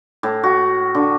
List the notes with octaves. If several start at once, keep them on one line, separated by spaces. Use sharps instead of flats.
A2
F#4
D3